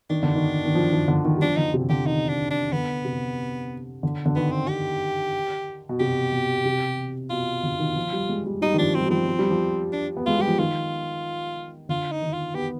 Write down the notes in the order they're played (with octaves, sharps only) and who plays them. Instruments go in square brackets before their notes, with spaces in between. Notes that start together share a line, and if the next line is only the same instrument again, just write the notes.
[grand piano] D#3 [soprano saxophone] D4
[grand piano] D3
D#3
D#3
F3
D#3
D3
D#3
G3
[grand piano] F3 [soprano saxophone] D4
[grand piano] D3 [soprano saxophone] D#4
[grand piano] C3
[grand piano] D3 [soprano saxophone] G4
[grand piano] D#3 [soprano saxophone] D#4
[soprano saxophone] D4
D4
[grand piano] D3 [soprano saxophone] B3
[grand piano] C3
D3
D3
[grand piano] D#3 [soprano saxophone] B3
[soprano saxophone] C4
G4
[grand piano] B2
[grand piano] C3 [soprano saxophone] G4
[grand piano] B2
C3
[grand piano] B2 [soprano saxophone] F4
[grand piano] D3
D#3
F3
G3
G#3
G3
[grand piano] G3 [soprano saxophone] D#4
[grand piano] D#3
[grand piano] F3 [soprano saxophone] D4
[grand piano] G3 [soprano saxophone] C4
[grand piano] G3
[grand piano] F3 [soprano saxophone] C4
[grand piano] F3
G3
F3
[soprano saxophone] D4
[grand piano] B3
[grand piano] G#3 [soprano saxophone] F4
[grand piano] G3 [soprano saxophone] G4
[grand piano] F3
[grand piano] D#3 [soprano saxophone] F4
[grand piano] D3 [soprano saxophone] F4
[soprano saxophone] D#4
[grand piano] D#3
[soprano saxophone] F4
[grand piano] B3 [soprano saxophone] G4